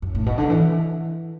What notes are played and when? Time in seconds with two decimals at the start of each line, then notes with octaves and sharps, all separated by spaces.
0.02 F#2
0.15 A2
0.26 B2
0.38 D3
0.50 E3